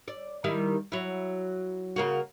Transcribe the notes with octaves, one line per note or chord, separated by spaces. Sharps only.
D5
D#3 G3 E4
F#3 E4
C#3 A#3 F#4